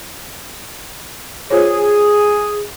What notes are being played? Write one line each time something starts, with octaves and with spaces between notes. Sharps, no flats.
F4 G#4 C5 C#5